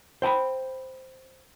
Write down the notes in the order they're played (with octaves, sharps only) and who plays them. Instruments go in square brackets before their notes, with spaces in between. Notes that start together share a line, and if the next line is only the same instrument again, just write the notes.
[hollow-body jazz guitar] C5 G5 A#5 B5